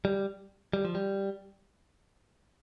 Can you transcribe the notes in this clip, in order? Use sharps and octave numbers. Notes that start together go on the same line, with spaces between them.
G3
G3
F3
G3